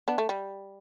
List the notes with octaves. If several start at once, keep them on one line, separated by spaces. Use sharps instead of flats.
B3 D4
A3
G3